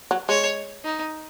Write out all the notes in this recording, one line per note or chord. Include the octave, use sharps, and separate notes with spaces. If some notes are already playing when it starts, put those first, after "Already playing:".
F#3
G#3 C#5
D#4